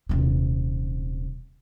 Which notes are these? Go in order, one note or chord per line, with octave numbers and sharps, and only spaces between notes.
D#1 C3